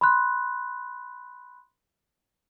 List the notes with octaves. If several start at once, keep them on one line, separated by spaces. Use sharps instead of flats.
B5 C6 F#6